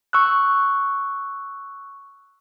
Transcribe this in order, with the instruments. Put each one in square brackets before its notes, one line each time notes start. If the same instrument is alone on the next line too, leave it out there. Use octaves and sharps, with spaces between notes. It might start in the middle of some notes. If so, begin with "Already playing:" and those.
[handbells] C#6 E6 F#6